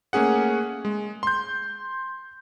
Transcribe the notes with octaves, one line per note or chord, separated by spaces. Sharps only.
A3 A#3 C#4 G#4 F#5
G#3
C6 G6